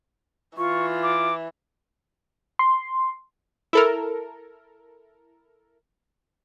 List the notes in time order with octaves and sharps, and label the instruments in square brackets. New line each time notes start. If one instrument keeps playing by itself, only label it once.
[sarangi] E3 [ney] F4 [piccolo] C#6
[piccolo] D6
[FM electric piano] C6
[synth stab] E4 A4 A#4